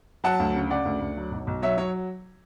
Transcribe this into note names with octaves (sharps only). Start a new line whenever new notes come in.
F#3 F#5 A5
D2
C#3
C#3 D5 F#5
D2
D2
F#3
B1
B1
F#3 C#5 E5
F#3 C#5